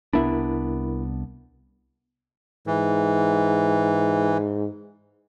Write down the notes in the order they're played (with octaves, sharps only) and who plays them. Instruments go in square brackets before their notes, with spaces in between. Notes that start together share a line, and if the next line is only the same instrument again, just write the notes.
[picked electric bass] C2 B3 D4 [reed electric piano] E4 A#4 B5
[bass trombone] G#2 [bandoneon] E3